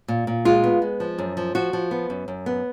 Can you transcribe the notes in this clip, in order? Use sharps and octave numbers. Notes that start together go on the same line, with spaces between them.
A#2
A#2
G#3 F4
B3
G#3
F3
F#2
F3
F3 F#4
F3
B3
F#2
F#2
B3